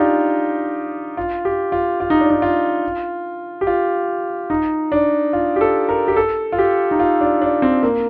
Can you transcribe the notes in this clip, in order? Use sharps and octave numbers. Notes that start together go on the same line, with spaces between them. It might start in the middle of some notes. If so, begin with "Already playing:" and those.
Already playing: D4 D#4 F4 G4
F4
G4
F4
F4
D#4
D4
D#4
F4
G4
F4
D#4
D4
F4
G4
A4
A#4
G4
A4
F4
G4
D#4
F4
D4
D4
C4
A#3